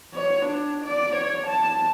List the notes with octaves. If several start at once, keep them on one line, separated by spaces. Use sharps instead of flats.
C#5
D4
D5
C#5
A5